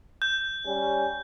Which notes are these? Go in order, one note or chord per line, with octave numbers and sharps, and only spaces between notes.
G6
G3 C#4